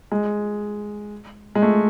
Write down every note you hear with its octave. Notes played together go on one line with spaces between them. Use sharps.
G#3
G#3
A3